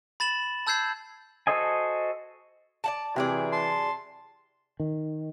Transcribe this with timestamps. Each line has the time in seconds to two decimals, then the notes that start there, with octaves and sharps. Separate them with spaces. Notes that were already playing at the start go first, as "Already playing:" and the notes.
0.20 B5 A6 E7 F#7
0.67 A5 E6 G6 G#6 C7
1.47 F#4 A4 C5 D#5 G#5
2.84 D5 F#5 A5
3.16 C3 E3 F#3 G#4 D5
3.52 A5 C6
4.80 D#3